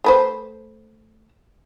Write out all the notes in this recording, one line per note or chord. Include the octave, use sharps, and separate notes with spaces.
A3 B4 C5